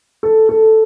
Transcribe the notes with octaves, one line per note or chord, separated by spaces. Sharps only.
A4
A4